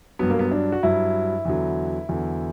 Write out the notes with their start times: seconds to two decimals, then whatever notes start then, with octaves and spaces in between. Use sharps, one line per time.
0.19 G2 F#3 B3
0.30 A#3
0.39 B3
0.51 D4
0.72 F#4
0.83 G2 F#3 E4
1.45 E2 D3 F#3
2.09 E2 D3 F#3